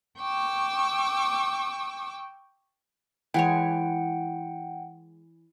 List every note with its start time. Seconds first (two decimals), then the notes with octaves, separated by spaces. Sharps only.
0.20 G5 C#6 D6 E6
3.34 E3 G#3 C#5 F#5 G5